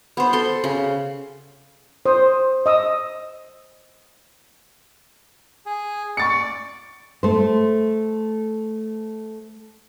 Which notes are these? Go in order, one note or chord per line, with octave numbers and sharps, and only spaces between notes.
B3 C5
A4 C6
C#3
C5 D#6
D#5 D#6 E6
G#4
D5 C#6 A6 C#7
A3 C5